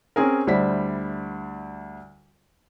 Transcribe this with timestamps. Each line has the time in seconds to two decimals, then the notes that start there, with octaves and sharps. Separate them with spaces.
0.16 C4 C#4 G#4 A#4
0.47 D2 G3 E4 C5 B6